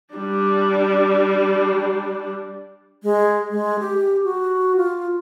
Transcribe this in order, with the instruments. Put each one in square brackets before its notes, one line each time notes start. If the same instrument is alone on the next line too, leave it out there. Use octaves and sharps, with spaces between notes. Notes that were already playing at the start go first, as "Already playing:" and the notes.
[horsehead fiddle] G3 D4
[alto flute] G#3
G#3
G4
F#4
F4